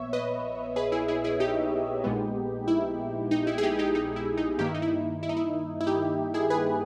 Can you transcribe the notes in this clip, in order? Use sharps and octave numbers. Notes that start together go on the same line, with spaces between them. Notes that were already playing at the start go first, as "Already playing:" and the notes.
Already playing: A#1 A#2 B3 C#5 E5
B4 D#5
G#4 B4
E4 G#4
E4 G#4
E4 G#4
D#4 G4
A#1 A#2 G#3 B3
E4
D#4
E4
G#4
D#4 G4
D#4 G4
D#4
E4
D#4
G2 D#3 A#3 G4
E4
D#4
E4
E4
D#4
E4
E4
D#4 G4
E4 G#4
G#4 B4